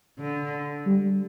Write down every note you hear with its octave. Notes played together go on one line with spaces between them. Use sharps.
D3
G3